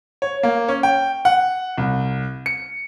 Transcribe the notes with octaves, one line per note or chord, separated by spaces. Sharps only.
C#5
A#3
C#4
G5
F#5
C2
C#7